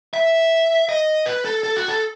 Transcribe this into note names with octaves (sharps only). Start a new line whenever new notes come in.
E5
D#5
B4
A4
A4
F#4
A4